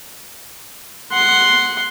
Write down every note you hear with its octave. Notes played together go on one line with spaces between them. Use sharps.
F#5 C6